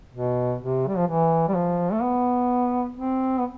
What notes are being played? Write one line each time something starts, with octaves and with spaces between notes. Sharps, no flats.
B2
C3
G3
F3
E3
G3
F3
A3
B3
C4
B3